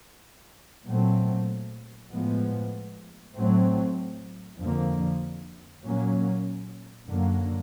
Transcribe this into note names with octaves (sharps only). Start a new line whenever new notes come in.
A#2 F#3 A3 C4
A2 F3 G#3 B3
A2 F#3 A3 C4
F2 D3 F3 A#3
A#2 F#3 A#3 C#4
F#2 D3 F#3 A#3